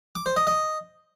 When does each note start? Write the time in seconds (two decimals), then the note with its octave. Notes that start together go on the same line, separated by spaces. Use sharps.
0.15 D6
0.26 C5
0.36 D#5
0.47 D#5